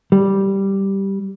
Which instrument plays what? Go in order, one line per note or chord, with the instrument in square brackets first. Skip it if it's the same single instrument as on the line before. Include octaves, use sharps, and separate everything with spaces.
[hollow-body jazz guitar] G3